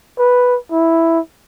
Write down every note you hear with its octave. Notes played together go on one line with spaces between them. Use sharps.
B4
E4